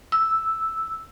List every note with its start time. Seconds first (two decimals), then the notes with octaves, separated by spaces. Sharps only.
0.12 E6